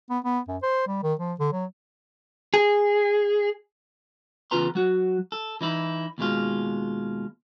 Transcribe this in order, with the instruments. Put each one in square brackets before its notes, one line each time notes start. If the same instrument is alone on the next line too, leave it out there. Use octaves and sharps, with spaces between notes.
[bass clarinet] B3
B3
F#2
C5
G3
D#3
F3
D3
F#3
[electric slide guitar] G#4
[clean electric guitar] E2 C#3 F4 B4 A#5 C6
F#3 F#4
A4
E3 D#4 E4
D#2 B2 G#3 F4